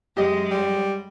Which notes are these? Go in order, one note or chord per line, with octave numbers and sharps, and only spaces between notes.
F#2 G#3 G4 D#5
G3